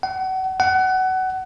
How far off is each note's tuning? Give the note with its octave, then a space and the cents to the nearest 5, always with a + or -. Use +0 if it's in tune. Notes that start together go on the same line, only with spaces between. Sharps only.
F#5 +35
F#5 +25